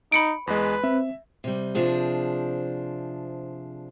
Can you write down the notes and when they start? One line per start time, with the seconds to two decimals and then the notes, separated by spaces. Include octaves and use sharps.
0.12 D#4 B5 C#7 D7
0.47 E2 G#3 B4
0.84 C4 E5
1.44 C3 G3
1.75 C3 F3 D4 G#4